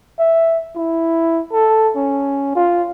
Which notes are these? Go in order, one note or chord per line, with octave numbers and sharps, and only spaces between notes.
E5
E4
A4
C#4
F4